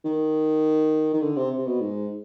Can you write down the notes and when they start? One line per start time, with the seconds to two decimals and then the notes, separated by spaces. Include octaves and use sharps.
0.04 D#3
1.13 D#3
1.22 D3
1.36 C3
1.58 C3
1.66 B2
1.80 G#2